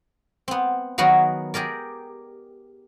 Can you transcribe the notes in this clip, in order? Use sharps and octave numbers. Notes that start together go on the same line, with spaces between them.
B3 C4
D#3 F#3 B3 F#4 G#4 A#4
G4 G#4 A#4 D5